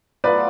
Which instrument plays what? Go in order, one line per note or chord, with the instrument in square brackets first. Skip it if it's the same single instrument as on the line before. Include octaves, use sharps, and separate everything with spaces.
[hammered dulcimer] A2 F#3 B3 F4 [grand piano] B4 D5